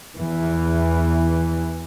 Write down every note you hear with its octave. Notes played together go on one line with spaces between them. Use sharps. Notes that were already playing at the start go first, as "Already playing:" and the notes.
E2 E3